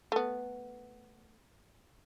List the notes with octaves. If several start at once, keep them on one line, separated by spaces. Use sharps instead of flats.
A3 B3